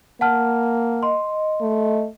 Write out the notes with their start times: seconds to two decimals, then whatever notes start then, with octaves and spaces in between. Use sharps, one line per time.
0.21 A#3 F#5 A5 F6
1.03 D#5 C6
1.61 A3